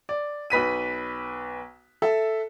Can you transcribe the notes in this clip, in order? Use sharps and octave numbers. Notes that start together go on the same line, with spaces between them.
D5
B1 B4 B6 D#7
A4 E5